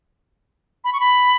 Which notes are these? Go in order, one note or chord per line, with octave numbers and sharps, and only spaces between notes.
B5
C#6
B5